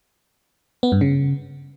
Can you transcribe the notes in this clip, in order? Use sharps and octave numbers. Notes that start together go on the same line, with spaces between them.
B3
G2
C#3